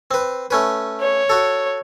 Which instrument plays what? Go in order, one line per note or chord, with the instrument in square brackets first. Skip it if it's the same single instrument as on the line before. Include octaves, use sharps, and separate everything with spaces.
[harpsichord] C4 B4
A3 C#4 B4
[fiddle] C#5
[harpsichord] F#4 A4